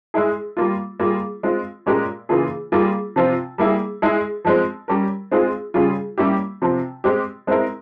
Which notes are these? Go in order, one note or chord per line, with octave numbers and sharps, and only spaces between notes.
G#3 E4 G#4
G3 A#3 F4
G3 A#3 F4 G#4
G#3 C4 F4
A#2 G#3 C#4 G4 A#4
C#3 E3 A#3 F4 G#4
G3 A#3 F4 G#4
C3 F3 C4 F4
G3 A#3 E4 G#4
G#3 E4 G#4
F3 G#3 C4
G3 C#4 G4 A#4
G#3 C4 F4 G#4
C#3 G3 C#4 F4 G#4
G3 A#3 C#4 E4 G4
C3 F3 C4
G#3 C4 G4
G#3 C4 E4 A#4